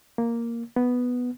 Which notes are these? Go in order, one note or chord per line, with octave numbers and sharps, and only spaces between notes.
A#3
B3